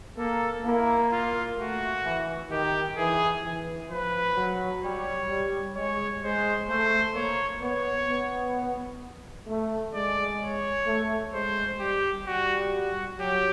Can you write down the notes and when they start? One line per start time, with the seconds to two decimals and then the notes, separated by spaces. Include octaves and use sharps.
0.18 A#3 A4
0.64 A#3 E4
1.12 F4
1.58 A3 F#4
2.04 E3
2.51 D#3 G4
2.97 E3 G#4
3.44 E3
3.90 F3 B4
4.37 F#3
4.83 G3 C#5
5.29 G3
5.75 G#3 C#5
6.23 G#3 C5
6.69 A3 C5
7.15 A#3 C#5
7.62 B3 C#5
8.09 B3
9.47 A3
9.94 G#3 D5
10.41 C#5
10.87 A3
11.33 G#3 C5
11.80 G3 G4
12.26 G3 F#4
12.73 F#4
13.19 F#3 G4